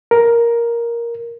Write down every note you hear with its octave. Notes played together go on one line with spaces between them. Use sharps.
A#4